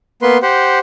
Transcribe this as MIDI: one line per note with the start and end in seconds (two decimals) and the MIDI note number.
0.22 0.37 58
0.22 0.37 59
0.22 0.37 71
0.22 0.37 84
0.42 0.79 67
0.42 0.79 72
0.42 0.79 78